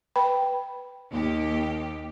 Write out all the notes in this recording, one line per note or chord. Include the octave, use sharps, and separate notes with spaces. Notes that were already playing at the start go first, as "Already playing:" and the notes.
B4 G5 B5
D#2 G4